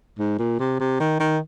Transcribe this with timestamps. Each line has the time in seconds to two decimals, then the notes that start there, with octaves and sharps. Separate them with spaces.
0.19 G#2
0.39 A#2
0.60 C3
0.80 C3
1.00 D#3
1.20 D#3